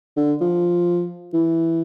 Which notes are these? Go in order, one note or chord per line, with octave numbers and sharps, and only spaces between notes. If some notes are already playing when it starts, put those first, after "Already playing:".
D3
F3
E3